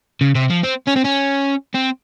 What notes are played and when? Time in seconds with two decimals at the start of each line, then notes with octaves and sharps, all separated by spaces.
0.21 C#3
0.35 C3
0.50 F3
0.63 C4
0.87 C#4
0.96 C4
1.04 C#4
1.75 C4